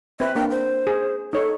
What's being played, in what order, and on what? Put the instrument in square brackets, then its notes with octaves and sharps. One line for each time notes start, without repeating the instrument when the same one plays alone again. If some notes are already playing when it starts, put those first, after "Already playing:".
[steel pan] C4 B4 [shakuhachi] E5
[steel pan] A#3 D4 A#4 [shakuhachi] G5
[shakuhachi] C5
[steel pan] G#4
[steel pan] D#4 C#5 [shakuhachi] A4